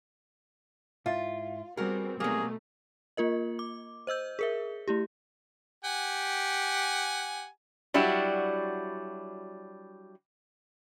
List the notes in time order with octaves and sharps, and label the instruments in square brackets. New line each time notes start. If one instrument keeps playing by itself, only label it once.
[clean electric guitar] G#2 E4 E5 [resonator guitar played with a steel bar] F4
[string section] G3 B3 C4 [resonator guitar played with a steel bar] F#4 A#4 [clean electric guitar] G#4
[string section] B2 A3 D#4 [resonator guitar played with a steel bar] F#3 A#3 [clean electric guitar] G3 C4 [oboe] G#4
[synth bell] A#3 F4 A#4 D#5
D6
C5 D#5 E6 G6
G#4 A#4 E5
A3 E4 G4
[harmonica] G4 F#5 G#5
[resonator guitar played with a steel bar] F#3 G3 D4 E4 F#4